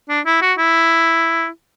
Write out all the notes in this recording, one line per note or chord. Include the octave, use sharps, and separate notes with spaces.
D4
E4
F#4
E4